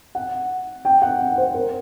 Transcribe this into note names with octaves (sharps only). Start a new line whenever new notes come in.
F#5
G5
F#5
C5
A#4